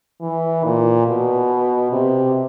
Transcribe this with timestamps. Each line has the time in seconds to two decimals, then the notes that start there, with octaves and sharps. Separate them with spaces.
0.21 E3
0.65 A#2
1.07 B2
1.92 C3